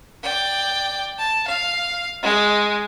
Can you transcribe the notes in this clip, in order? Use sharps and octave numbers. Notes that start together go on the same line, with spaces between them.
D5 G5
A5
F5
G#3